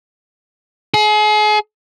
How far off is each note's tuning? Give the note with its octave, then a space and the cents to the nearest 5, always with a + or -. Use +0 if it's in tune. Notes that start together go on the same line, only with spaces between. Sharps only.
G#4 +35